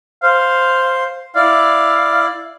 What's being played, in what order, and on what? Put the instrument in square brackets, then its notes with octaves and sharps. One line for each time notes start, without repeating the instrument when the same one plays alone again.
[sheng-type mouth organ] C5 [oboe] F5
[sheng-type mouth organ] E4 D5 [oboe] F5